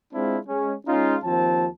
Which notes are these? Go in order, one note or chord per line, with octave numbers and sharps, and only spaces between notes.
G#3 C4 D4 E4 F4
G#3 C#4
G#3 C#4 D#4 F4
D#2 F3 C4 A5